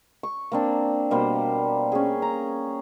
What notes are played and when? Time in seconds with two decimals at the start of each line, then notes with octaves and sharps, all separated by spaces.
0.23 C#6
0.52 A#3 C4 D4
1.11 B2 G3 A#3 C5
1.92 C#4 G#4
2.22 A#5